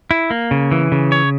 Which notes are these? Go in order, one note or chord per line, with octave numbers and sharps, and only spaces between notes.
E4
A#3
C#3
E3
C#3
C#5